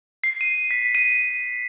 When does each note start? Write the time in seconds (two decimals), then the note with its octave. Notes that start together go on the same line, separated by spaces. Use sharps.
0.24 C7
0.41 D#7
0.71 B6
0.95 D#7